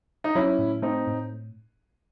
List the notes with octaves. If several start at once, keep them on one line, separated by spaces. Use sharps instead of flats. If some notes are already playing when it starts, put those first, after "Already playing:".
D#4
F#3 C#4 E4
A2
A3 C4 D#4
A2